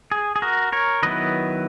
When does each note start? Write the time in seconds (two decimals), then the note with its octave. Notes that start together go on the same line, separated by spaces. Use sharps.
0.12 G#4
0.36 G#4
0.42 F#4 A#4
0.72 A#4 C#5
1.03 D#3 F#3 B3 E4 B4 D#5